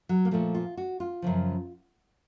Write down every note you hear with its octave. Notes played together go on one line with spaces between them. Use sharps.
F#3
A#3
A#2 F3 A3
F4
F#4
F4
F#2 C#3 F3